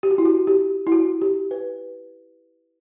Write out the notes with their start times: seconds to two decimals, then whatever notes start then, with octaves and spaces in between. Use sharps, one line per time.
0.03 G4
0.11 F#4
0.18 E4
0.25 F#4
0.47 G4
0.87 E4
0.92 F#4
1.22 G4
1.51 B4